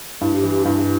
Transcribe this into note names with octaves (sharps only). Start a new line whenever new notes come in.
G2 E4
G4
E3
G4
G2 E4